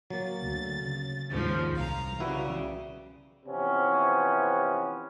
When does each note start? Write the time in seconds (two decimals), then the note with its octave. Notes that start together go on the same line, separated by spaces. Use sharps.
0.10 F#3 A#3 A6
0.42 D2
0.84 C#3
1.28 D#2 G#2 C#3 F3
1.75 C2 F5 A#5
2.20 C#3 G3 E4 F#4 B4
3.46 C3 E3 F3 B3 C#4